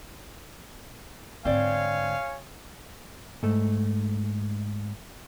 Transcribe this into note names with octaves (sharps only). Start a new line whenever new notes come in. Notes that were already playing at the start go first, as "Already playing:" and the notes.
G#2 D3 C4 C#5 D5 F5 G#5
G#2 A3